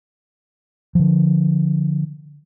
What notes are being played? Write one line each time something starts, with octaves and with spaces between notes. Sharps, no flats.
D3 F3